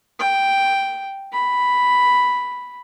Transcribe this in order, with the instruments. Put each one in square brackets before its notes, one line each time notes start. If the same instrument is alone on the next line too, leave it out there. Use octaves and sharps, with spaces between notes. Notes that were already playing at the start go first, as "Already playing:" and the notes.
[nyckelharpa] G5
B5